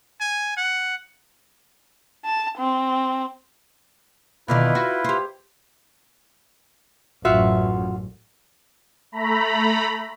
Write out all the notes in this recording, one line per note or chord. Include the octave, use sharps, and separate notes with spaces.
G#5
F#5
A5
C4
B2 D3 D#3 E4 F4 B4
F#4
G4 C5
A1 F#2 F4 F#4 E5
A3 A#5 B5